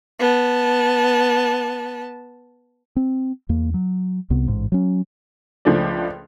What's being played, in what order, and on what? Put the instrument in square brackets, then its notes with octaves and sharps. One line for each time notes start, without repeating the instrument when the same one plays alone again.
[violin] B3 A5
[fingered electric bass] C4
E2 A#3
F#3
C2 C3 B3
A1 G#2
F#3 C#4
[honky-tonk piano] C#2 F3 A3 D4 D5